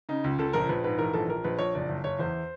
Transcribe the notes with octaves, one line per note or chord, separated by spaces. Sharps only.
C#3 D#4
C#2
C#2 A4
A#1 A#4
A#1 B4
G#2 B4
E3 A#4
A#1 A4
A#1 A#4
A#1 B4
A#1 C#5
F#1 D5
F#1
F#1 C#5
E2 C5